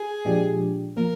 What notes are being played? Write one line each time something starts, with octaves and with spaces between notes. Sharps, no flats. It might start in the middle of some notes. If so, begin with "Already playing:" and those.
Already playing: G#4
A#2 F3 G#3 D4 G4
F3 A#3 A#4